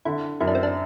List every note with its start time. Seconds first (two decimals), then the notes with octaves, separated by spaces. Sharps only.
0.05 D3 E4
0.40 F#2 E4
0.47 D4
0.55 C4
0.63 D4